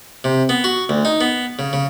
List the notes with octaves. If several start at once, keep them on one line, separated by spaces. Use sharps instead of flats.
C3
B3
F#4
D2
D#4
B3
C#3
C#3